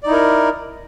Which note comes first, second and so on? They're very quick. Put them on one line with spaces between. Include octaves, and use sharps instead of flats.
D5 D#4 E4 A#4